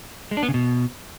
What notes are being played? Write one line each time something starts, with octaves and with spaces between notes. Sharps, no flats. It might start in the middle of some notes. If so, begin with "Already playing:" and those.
G#3
D4
B3
C#3
B2